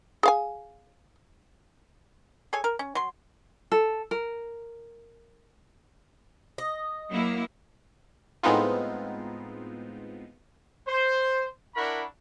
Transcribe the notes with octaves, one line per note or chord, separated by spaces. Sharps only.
G#4 F5 G#5
G#4 A4 C#5 G#5
A#4
C#4
F#3 C6
A4
A#4
D#5
F#3 A#3 E4
A2 G#3 B3 C4 D#4 F4
C5
D4 E4 A#4 F#5 B5 C#6